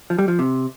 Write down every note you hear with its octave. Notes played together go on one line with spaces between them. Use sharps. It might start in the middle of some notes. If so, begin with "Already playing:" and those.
F3
G3
F3
C3